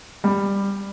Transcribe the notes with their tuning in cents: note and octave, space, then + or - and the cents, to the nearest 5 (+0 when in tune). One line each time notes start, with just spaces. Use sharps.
G3 +15